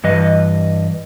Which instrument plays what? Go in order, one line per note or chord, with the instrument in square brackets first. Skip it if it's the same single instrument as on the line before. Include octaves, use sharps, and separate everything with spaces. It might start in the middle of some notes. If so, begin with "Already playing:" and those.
[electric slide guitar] G2 E3 B4 D#5